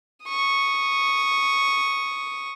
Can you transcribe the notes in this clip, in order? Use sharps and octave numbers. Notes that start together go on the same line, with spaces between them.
C#6 D#6